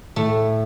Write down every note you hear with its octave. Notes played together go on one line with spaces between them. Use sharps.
A2 A3